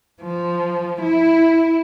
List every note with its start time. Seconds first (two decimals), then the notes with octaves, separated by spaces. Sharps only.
0.22 F3
1.02 E4